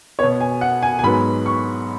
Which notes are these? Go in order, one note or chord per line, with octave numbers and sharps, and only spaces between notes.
B2 B3 C#5
G#5
F#5
G#5
G#5
G#2 F#3 B3 B5
C#6